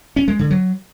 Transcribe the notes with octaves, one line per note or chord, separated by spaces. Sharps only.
C#4
G#3
D3
F#3